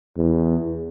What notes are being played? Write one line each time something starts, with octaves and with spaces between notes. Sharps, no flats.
E2